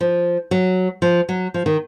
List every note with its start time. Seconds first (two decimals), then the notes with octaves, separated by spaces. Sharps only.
0.01 F3
0.51 F#3
1.02 F3
1.29 F#3
1.54 F3
1.66 D#3